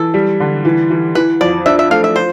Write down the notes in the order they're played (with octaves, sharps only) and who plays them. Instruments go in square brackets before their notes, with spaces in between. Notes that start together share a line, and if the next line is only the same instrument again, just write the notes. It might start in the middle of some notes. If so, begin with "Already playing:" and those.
Already playing: [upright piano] E3 [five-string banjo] A4
[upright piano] G3
D3
E3
E3
[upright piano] E3 [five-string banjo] B4
[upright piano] F2 [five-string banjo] D5
[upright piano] D4 [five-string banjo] E5
[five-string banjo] E5
[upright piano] A3 [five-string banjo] F5
[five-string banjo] E5
[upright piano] F3 [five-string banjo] C5